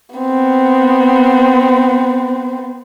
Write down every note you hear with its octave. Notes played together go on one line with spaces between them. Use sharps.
B3 C4